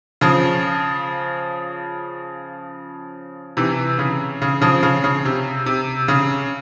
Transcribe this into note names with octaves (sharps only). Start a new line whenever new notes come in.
C#3 F3
C3 E3
C#3
C#3
C#3 F3
C#3
C#3
C3
C3
C#3